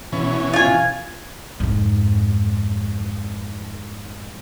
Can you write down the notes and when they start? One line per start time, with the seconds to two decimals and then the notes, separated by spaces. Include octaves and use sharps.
0.12 B2 E3 C#4
0.53 F4 G#5
1.60 F2 G#2